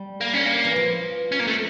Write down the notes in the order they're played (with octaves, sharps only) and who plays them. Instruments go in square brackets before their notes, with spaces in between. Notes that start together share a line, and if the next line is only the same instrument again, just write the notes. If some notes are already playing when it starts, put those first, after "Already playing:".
Already playing: [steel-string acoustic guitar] G3
[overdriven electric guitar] A#3
C#4
A#3
[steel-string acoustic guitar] E3
F3
[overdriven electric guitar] C#4
A#3
A3